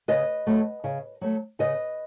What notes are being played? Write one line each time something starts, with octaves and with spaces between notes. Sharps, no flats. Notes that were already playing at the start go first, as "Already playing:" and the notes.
C#3 B4 D#5
F#3 A3
C#3
F#3 A3
C#3 B4 D#5